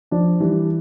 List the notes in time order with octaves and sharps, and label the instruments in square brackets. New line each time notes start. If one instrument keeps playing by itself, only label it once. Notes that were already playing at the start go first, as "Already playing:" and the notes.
[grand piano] F3 [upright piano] D4
[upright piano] E3 [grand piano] G3